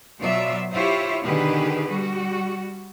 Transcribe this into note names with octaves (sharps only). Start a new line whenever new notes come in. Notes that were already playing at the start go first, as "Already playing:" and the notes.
B2 F#3 B3 F4 D5 E5
E4 F4 G4 C5 C#5 E5
B2 D3 D#3 G4 G#4 B4
G3 F#4